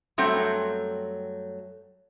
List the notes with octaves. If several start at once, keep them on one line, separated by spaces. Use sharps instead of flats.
F#2 F#3 G3 A3 C4 G5